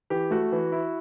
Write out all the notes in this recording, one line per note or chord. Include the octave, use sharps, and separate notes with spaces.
E3 G4
A3 F#4
E3
E4